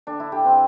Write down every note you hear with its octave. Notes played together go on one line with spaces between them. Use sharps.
D3 D4
E4
D3 G4
C4